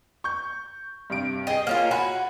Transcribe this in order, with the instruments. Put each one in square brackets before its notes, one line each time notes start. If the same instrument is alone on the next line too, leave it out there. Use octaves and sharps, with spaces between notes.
[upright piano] C#6 G6
G2 C3 D7
[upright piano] G#4 G5 [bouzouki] D#5
[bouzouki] A#3 C#4 F4
[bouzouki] F#4 [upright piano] G#5 B5